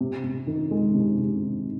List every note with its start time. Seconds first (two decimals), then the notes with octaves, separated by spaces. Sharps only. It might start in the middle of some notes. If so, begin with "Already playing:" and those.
0.01 C3
0.24 C3
0.47 D#3
0.71 G#3
0.94 C3
1.17 C3
1.41 D#3